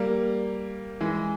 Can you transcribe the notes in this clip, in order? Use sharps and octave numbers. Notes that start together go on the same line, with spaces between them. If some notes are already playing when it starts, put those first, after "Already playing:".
Already playing: G3 A#3
E3 G#3